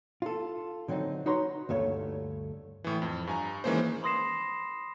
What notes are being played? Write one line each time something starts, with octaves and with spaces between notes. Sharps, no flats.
F4 A4
D3 F#3 C4 C#4 D#4
D#4 F#4 B4 C#5 A#5 C6
D2 G2 A3 C#5
A2 E3
F2
G2 G#5 A#5
D#3 E3 G#3 A#3 C#4 C5
B5 C6 D#6 A#6 C7 E7